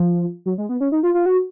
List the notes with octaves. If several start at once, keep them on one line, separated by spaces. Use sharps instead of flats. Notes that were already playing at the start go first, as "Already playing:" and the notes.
Already playing: F3
F#3
G#3
B3
C#4
D#4
F4
F4
F#4